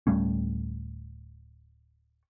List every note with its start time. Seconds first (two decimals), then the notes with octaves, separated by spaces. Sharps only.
0.07 D1 G3 A3 C#4